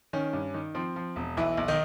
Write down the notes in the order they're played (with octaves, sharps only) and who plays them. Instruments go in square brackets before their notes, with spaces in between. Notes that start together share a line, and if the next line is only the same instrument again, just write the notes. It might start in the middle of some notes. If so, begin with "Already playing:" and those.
[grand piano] D#3 C#4
G2
D#3
F3 C4
F3
E1
B1 E3 E4
B1
D#3 D#4